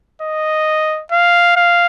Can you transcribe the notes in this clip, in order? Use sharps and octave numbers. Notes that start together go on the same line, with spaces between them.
D#5
F5
F5